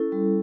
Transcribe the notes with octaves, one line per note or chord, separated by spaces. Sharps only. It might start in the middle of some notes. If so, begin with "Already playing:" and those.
Already playing: C#4 E4 A4
G3